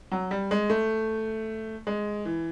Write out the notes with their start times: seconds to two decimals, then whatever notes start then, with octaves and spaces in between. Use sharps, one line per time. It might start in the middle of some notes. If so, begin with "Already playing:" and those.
0.12 F#3
0.31 G3
0.51 G#3
0.70 A3
1.87 G#3
2.25 E3